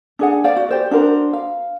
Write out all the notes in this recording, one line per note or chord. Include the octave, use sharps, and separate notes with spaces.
D4 G#4 F#5
C5 D5 F5
F#4
G4 C5 D5
D4 F#4 A#4 C5
F5